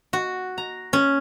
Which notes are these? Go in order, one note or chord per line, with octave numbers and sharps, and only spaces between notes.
F#4
A#5
C#4